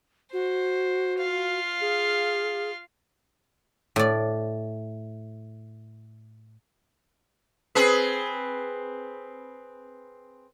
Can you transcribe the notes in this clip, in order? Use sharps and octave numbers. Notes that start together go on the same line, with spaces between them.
F#4 C5
F4 F5
G#4
A2 D5
C4 G#4 B4